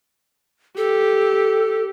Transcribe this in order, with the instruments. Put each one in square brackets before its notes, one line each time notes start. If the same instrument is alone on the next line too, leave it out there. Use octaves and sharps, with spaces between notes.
[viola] G4 [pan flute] A4